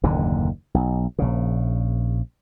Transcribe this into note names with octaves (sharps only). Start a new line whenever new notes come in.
F#1 D#2 A#2 D3
B1
A#1 C#3